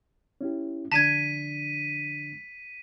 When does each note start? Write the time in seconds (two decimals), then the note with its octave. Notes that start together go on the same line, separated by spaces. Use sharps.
0.41 C#4 E4 G4
0.92 D3 F3 D4 A5 G#6 B6 D#7